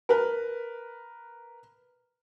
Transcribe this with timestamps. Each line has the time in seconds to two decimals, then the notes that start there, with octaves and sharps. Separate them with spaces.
0.09 A#4 B4